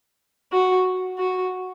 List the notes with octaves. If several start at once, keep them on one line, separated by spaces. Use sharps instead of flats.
F#4
F#4